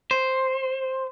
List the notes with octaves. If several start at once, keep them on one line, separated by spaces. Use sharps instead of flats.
C5